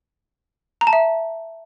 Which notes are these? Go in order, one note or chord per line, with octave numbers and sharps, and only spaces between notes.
A#5
A5
E5